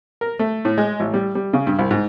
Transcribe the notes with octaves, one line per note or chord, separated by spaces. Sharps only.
A#4
A3
A2
G#3
A1
G3
G3
C#3
G2
C2
G#2